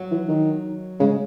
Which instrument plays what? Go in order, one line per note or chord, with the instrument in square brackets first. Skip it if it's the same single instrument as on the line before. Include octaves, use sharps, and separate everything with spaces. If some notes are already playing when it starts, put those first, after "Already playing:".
Already playing: [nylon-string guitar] F#3
[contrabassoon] E3
D#3
[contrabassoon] C#3 [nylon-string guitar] G#3